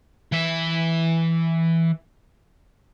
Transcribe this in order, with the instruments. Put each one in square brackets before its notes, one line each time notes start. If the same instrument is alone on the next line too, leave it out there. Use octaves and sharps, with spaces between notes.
[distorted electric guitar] E3 E5